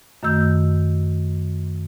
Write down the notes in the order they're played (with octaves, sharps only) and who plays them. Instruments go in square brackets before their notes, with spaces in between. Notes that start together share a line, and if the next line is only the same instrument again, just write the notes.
[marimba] F#2 D#3 A3 E6 G6